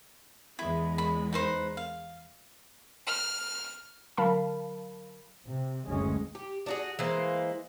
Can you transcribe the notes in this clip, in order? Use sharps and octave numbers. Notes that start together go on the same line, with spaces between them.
E2 G#3 E4
B5
D#4 B4 C5
F5
F6
D3 F#3 A#4 F5 A5 B5
C3
F#1 D2 G#3 C#4
G4
D4 F#4 G#4
E3 G#3 A#3 C5